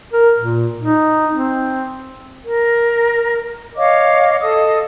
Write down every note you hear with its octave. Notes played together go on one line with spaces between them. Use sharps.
A#4
A#2
D#4
C4
A#4
C#5 D#5 F5 D6
A4 D#5 D#6